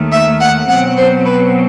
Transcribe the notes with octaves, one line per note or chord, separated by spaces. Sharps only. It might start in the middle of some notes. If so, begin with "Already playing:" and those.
Already playing: D#2 D#3 A3
E5
F#5
B2 F#3 C4 F#5
C5
B4